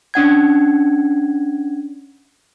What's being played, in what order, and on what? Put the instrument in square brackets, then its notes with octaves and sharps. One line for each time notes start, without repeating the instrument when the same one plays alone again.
[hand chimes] C#4 D4 F#5 G#6